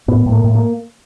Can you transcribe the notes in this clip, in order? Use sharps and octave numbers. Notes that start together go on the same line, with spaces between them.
A2 B3
A2
A#3
A2
A#3